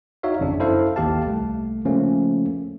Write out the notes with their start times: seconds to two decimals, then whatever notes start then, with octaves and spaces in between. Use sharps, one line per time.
0.23 D#4 F#4 C#5 E5 F5
0.40 G#1 F2 C#3 D4
0.59 F#2 E4 A4 C5 F5
0.96 G#1 D#2 G4 F5 A5
1.26 C2 A3
1.85 C#3 F3 A3 A#3 C#4